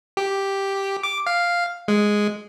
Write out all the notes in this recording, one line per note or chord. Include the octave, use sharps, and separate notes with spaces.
G4
D6
F5
G#3